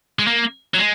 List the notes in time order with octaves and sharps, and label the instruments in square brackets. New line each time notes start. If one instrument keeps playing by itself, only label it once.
[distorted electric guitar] G#3
A#3
F#3
G#3